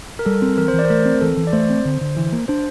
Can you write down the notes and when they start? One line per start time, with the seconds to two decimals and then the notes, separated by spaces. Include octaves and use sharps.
0.19 A#4
0.25 G3 A4
0.42 C4
0.57 E3 A#4
0.68 C5
0.73 E3
0.79 D5
0.85 C5
0.90 A3 A#4
1.05 C4
1.21 E3 A4
1.37 E3
1.47 D5
1.53 A3 C5
1.70 C4
1.85 D3
2.01 D3
2.17 E3
2.32 A#3
2.48 D4 C5